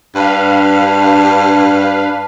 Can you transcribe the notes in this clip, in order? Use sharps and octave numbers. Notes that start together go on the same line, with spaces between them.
G2 D4 B4 F5